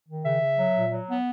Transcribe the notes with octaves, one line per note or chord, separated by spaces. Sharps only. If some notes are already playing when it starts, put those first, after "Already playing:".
D#3
C#3 E5
C#3
F#3
A#2
F#3
B3